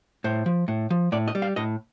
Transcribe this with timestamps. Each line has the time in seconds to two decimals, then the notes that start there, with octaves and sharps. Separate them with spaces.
0.24 A2 C5
0.46 F3
0.68 A2
0.90 F3
1.12 A2 D5
1.28 D#5
1.35 G3
1.42 F5
1.56 A2 D#5